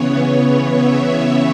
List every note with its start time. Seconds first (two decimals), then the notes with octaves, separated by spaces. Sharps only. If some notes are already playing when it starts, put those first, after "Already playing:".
Already playing: C#3 E3 B3 C#5
0.66 E5